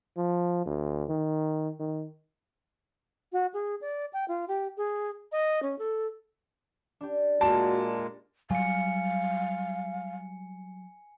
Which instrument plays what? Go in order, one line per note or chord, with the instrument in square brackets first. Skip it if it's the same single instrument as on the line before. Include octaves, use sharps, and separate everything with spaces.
[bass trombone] F3
D2
D#3
D#3
[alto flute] F#4
G#4
D5
G5
F4
G4
G#4
D#5
C#4
A4
[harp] D4 G4
[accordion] A#2 G#3 A#3 [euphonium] F#4 [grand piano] A5
[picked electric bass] F#3 G3 [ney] F5 [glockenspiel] G#5 C#7